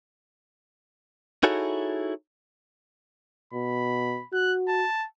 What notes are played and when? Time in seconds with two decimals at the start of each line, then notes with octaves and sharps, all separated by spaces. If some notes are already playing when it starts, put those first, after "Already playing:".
1.43 D#4 E4 F#4 G#4 A4 C#5
3.53 B2 B5
4.33 F#4 F#6
4.68 A5